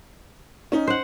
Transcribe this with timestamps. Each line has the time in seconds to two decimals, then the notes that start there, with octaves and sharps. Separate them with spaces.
0.72 C#4 D#4
0.88 C5 F#5